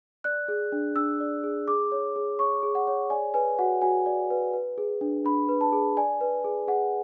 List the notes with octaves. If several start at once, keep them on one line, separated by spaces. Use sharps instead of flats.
D5 F#6
G#4
D4
D4 E6
D5
G#4
G#4 D6
C#5
G#4
C#5 C#6
G#4
F#5
C#5
D5 G#5
B4 G#5
F#4 F#5
F#4 G#5
D5
B4
B4
G#4
D4
D4 B5
B4
A5
G#4
D5 G#5
B4
G#4
G#4 F#5